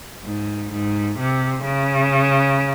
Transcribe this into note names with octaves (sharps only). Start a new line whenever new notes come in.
G#2
G#2
C3
C#3